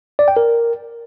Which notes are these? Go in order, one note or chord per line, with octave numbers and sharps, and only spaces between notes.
D5
G5
A#4